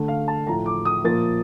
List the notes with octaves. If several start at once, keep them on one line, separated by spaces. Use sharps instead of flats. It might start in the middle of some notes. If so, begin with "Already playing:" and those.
Already playing: D3 A3
F5
A5
A2 F3 A3 A#5
D6
D#6
A#2 F3 A#3 A6